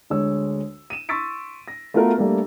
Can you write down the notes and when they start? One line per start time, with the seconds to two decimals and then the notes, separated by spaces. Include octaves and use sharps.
0.10 D2 G#3 C#5 E6
0.90 D#7 E7
1.09 C6 C#6 E6 A6 B6 D7
1.68 A#6
1.94 A3 B3 F4 F#4 A#4 B4
2.17 G3 A3 A#3 D4